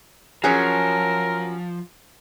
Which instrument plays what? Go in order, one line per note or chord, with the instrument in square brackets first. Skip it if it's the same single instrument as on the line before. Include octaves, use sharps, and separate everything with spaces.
[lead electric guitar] F3 [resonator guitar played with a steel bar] F#3 C#4 [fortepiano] G#4 [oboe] A#4